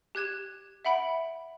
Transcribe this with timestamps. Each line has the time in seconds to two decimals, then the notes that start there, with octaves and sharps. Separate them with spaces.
0.15 G4 F#6 G#6 E7
0.85 E5 F#5 B5 D7